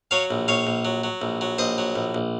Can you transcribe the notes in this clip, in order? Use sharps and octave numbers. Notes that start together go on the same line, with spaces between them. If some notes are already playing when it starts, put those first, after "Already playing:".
F#3 C#5 F5
A#1
A#1 C#5 F5
A#1
F#3
F#3
A#1
F#3
A#1 C5 D#5
F#3
A#1
A#1